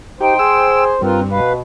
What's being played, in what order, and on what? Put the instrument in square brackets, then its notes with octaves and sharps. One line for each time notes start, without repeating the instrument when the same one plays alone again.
[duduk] D#4 [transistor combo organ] G4 [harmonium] C5 [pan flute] G5
[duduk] G#4 [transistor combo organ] E6
[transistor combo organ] G2 [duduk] C4 [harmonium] F4 A#4 [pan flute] B4
[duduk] B2 [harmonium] B4 [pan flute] F5